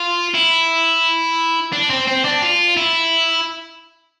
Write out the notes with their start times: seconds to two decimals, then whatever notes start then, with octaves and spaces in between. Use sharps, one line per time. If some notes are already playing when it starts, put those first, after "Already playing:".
Already playing: F4
0.34 E4
1.73 D4
1.90 C4
2.07 C4
2.25 D4
2.42 F4
2.77 E4